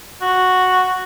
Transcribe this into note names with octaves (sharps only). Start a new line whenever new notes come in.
F#4